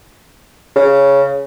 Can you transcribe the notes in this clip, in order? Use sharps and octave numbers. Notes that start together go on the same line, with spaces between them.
C#3